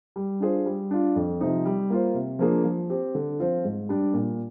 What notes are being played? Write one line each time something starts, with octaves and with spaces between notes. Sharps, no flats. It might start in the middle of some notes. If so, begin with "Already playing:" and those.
G3
D4 F4 G#4 C5
G3
D4 F4
F2
C3 F3 C4 D#4
G3
A#3 F4 C5
C3
F3 A#3 D4 G#4
F3
C4 G4
D3
F3 C4 F4
G#2
G3 D4
A#2